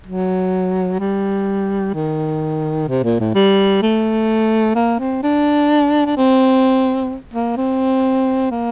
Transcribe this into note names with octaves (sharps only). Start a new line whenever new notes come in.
F#3
G3
D#3
C3
A#2
A2
G3
A3
A#3
C4
D4
D4
C4
A#3
C4
A#3